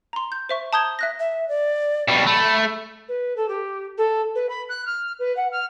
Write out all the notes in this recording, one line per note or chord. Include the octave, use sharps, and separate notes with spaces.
A#5 C6
G6
C5 E5 C#6
A5 A#5 D#6 G6 G#6 G7
E5 F#6 A#6
E5
D5
B2 G3
A3 B5
B4
A4
G4
A4
B4
B5
F#6
F6
B4
F#5
F6